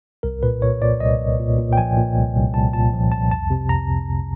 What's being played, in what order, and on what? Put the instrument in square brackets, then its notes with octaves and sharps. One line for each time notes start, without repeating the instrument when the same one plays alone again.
[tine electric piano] C2 A#4
A#2 B4
A#2 C#5
A#2 D5
C2 D#5
C2
A#2
A#2
G5
F3 G#5
A#2
C2
C2
C2 A5
A#2 A5
F3
C2 A5
F2 A5
C3
F2 A#5